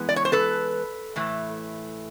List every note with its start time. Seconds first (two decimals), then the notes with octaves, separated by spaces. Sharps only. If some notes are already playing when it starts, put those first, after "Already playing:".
Already playing: E3 G#3 B3
0.09 D5
0.16 C#5
0.25 C5
0.32 A4 B4
1.16 A2 E3 A3